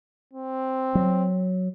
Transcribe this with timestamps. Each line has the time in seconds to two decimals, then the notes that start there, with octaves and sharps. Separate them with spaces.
0.34 C4
0.95 F#3